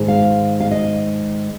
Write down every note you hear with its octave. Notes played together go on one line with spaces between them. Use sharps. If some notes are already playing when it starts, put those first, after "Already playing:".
Already playing: G#2 D#3 G#3
F5
F5
D#5